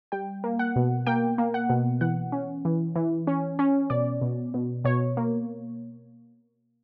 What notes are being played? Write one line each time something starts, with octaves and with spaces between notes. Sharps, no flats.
G3 G5
A#3
F#5
B2
A#3 G5
A#3
F#5
B2
E3 F#5
C#4
E3
E3
C#4
C#4
B2 D5
B2
B2
B2 C#5
A#3